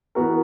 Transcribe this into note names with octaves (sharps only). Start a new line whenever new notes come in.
E3 B3 F#4 A#4